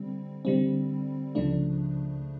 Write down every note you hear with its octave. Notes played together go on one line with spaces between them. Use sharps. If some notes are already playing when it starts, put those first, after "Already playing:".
Already playing: D3 G3 C4
D3 G3 C4
C#2 C#3 F3 A3 D4